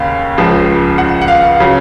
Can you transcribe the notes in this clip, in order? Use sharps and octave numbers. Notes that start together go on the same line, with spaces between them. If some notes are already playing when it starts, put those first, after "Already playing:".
Already playing: D#2 C#3 F5
C#2 C#3 F3
F#5
F#5
F5
C#3 F#3